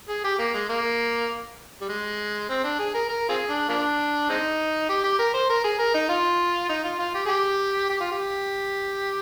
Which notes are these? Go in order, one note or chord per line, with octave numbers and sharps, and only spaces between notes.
G#4
G4
A#3
G#3
A#3
G3
G#3
C4
D4
G#4
A#4
A#4
C4 F4 G#4
D4
F3 A#3 D4
G#3 C4 D#4
G4
G4
A#4
C5
A#4
G#4
A#4
D#4
F4
D#4
F4
F4
G4
G#4
G4
G4
F4
G4